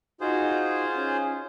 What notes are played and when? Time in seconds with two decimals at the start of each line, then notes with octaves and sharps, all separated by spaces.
0.21 D#4 F4 F#4 G#4 C5
0.95 C#4